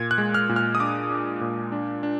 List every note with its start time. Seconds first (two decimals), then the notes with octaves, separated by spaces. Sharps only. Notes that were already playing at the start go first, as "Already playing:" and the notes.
Already playing: A#2 G#6
0.11 F#6
0.18 G#3
0.34 F6
0.49 A#2
0.56 F6
0.75 D#6
0.80 D4 D6
1.10 D4
1.41 A#2
1.72 D4
2.03 D4